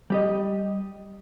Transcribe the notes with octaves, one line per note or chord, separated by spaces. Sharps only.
G3 G4 D#5